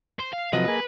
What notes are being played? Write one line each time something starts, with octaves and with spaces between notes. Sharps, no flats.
C5
F5
C3 F3 F#3 B4 D#5
A#3 G#4